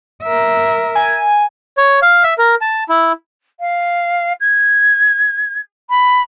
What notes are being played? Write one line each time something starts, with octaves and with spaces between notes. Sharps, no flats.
A#4 E5
G#5
C#5
F5
E5
A#4
A5
E4
F5
G#6
B5